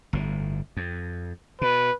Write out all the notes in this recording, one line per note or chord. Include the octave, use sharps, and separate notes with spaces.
G1 A2
F2
B2 B4